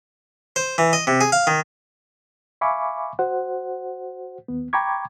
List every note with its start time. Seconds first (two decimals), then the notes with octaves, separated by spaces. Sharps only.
0.56 C5
0.78 E3
0.93 D#5
1.07 C3
1.21 G#4
1.32 F5
1.47 D#3
2.61 E5 F5 G#5 B5 C#6 D6
3.19 F#4 C5 F#5
4.48 D#2 B3
4.73 G5 A#5 B5 C#6 D6 G#6